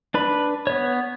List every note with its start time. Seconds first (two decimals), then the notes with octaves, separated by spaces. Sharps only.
0.14 D4 B4 B5
0.67 B3 C#5